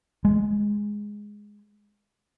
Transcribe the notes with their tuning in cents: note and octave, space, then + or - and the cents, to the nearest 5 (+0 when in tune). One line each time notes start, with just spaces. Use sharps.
G#3 +0